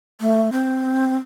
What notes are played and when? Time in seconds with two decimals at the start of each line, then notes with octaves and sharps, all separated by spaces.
0.21 A3
0.52 C4